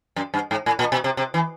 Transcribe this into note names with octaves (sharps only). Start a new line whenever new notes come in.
F#2
G2
G#2
A2
A#2
B2
C3
C3
E3